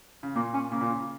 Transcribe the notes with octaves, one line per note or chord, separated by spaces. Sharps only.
C#3
A#2 A#3
C#4
C#3 A#3
A#2
C#3